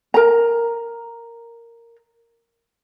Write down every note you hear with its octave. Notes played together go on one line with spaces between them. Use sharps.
A#4 A#5